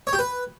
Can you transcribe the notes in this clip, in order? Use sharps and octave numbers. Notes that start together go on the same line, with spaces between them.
C#5
G4
B4